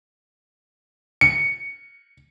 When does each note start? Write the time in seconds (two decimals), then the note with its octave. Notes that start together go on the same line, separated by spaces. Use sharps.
1.21 C#7